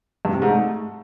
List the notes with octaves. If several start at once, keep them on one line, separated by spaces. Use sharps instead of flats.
G2
C3
G#2
A3